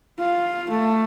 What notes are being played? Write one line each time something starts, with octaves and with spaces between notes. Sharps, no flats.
F4
A3